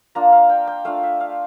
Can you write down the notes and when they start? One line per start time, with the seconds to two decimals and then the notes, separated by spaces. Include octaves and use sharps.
0.15 A#3 D4 F4 A#5
0.32 F5
0.49 G5
0.67 G5
0.85 A3 D4 F4 F5
1.03 E5
1.20 F5